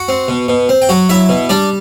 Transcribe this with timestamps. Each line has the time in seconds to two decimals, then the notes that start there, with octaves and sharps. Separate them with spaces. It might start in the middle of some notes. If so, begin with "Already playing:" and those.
Already playing: F#4 F#5
0.09 C4
0.28 B2
0.48 B2
0.69 C4
0.82 G5
0.89 F#3 F#4 F#5
1.09 F#3 E4 E5
1.29 B2
1.49 G3 D4 D5